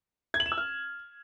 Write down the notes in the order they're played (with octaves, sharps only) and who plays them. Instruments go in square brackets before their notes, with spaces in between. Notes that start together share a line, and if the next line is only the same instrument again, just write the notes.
[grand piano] G#6
F#7
E7
E6
F6